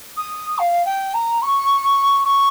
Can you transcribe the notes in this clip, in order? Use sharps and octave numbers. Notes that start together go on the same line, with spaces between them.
D#6
F5
G5
A#5
C#6
C#6